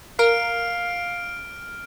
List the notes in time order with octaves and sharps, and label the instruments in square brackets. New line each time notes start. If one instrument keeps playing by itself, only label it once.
[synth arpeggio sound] A#4 [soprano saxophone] F5 [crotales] F6 D7